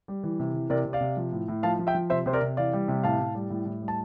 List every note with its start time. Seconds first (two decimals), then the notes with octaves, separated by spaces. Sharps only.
0.08 G3
0.23 E3
0.39 C3
0.54 E3
0.70 C3 A#4 D5
0.85 C3
0.93 D5 F5
1.01 C3
1.17 F3
1.32 A2
1.48 A2
1.63 F3 F5 A5
1.79 F3
1.87 E5 G5
1.94 F3
2.10 C3 C5 E5
2.26 C3 C5
2.33 A#4 D5
2.41 C3
2.57 E3 D5 F5
2.73 G3
2.88 C3
3.03 A2 F5 A5
3.19 A2
3.35 G3
3.50 A2
3.66 A2
3.82 G3
3.88 A5